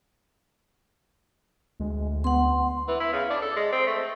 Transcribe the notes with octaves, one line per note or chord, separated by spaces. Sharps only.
D2 G#3
B3 F#5 C6
E3
E4
C#3
D4
A4
G#3
C4
A3